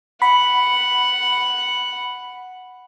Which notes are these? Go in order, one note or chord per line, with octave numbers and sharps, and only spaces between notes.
F#5 B5